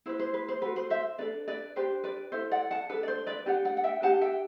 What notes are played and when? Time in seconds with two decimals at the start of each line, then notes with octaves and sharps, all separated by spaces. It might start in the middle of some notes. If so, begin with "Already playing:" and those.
0.06 E4 B4 C5
0.19 C5
0.34 B4
0.48 C5
0.62 F#4 A4 B4
0.76 C5
0.90 C5 E5
1.18 D4 A4 B4 D5
1.48 B4 D5
1.76 D4 G4 B4 C5
2.04 B4 D5
2.32 E4 A4 C5 E5
2.51 D5 F#5
2.71 F#5 A5
2.89 D4 A4 B4
3.03 D5
3.08 C5
3.27 B4 D5
3.46 D4 G4 B4 D5 F#5
3.65 D5 F#5
3.77 F#5
3.84 E5 G5
4.02 D4 G4 B4 F#5 A5
4.21 E5 G5